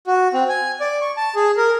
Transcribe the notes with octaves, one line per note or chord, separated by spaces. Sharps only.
F#4
C4
G#5
D5
C#6
A5
G#4
A#4